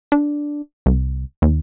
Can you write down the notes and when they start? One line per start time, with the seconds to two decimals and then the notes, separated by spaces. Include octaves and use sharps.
0.12 D4
0.86 C2
1.42 D#2